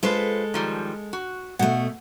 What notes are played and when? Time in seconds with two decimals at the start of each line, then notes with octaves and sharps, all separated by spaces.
0.03 G#3 F4 A4 B4 C5
0.54 D#3 F3 G3
1.13 F#4
1.59 B2 A3 F#5